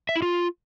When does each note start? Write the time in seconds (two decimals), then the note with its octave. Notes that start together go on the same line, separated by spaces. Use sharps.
0.09 E5
0.16 E4
0.22 F4